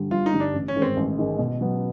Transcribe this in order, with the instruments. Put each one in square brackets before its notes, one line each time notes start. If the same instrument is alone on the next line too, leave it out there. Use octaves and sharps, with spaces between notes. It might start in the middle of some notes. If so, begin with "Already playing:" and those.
Already playing: [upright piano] G2 D3 G3
[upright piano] G1 [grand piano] F4
[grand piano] D#4
[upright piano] G2 D3 G3
[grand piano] D4
[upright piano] A1
[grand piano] C#4
[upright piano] G#2 D#3 G#3
[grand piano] C4
[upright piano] A1
G#2 D#3 G#3
B2
F#3 B3